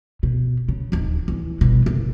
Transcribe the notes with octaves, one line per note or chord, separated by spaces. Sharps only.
B2
C#3
D1 D#2
E2
G1 B2
F#1